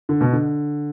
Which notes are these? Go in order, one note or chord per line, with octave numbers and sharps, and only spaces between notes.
D3
B2
D3